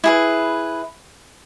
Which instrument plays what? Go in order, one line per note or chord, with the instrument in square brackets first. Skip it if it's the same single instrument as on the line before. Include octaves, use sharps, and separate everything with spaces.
[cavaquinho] E4 G#4 B4